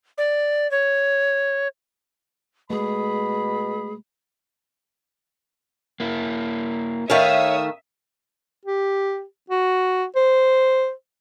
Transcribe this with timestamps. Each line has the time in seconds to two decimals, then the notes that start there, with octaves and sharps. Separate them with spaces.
0.18 D5
0.71 C#5
2.70 B2 G#3 A3 G#4 B5
6.00 A#3 E4
7.10 D#3 A3 C#5 E5 F5 D#6 E6
8.65 G4
9.50 F#4
10.16 C5